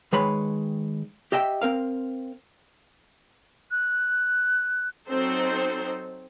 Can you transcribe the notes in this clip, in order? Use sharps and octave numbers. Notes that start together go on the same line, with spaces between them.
D#3 G#3 G#4 B4 C#5 B5
G4 D#5 E5 G5
C4 A#4 F5
F#6
F#3 C4 D#4 A4 C5